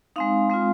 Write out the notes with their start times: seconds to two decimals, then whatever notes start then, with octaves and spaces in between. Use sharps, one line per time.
0.16 G#3 C4 D#4 F5
0.50 G#3 C4 F4